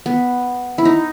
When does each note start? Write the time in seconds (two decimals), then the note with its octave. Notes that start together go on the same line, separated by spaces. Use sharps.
0.06 B3
0.78 E4
0.85 D#4